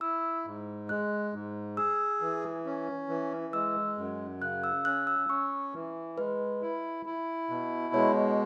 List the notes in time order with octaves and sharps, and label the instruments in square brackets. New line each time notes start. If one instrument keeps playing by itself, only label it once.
[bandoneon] E4 [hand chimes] E6
[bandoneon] G#2
[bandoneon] G#3 [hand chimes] F#6
[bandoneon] G#2
[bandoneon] G#4 [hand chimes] E6
[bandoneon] E3
C#4
E3
[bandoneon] G#3 [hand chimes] E6
[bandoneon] F#2
[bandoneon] C#3 [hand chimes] F#6
[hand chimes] E6
[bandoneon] C#4 [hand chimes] F#6
[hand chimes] E6
[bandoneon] C#4 [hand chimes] C#6
[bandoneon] E3
[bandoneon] G#3 [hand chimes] B4
[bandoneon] E4
E4
B2
[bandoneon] G#3 [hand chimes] C#5